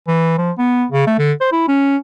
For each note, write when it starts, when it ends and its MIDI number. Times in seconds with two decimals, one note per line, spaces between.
0.08 0.36 52
0.38 0.51 53
0.58 0.85 59
0.92 1.07 49
1.07 1.14 57
1.18 1.32 50
1.41 1.49 72
1.52 1.64 64
1.68 1.97 61